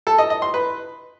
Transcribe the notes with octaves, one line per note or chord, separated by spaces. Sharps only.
A4
D#5
D#5
C6
B4